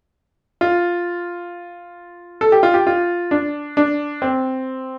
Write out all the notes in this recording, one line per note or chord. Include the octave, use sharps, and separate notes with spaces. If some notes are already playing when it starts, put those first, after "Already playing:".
F4
A4
G4
F4
G4
F4
D4
D4
C4